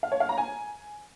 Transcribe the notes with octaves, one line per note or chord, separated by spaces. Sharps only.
F5
C#5
F5
A#5
G#5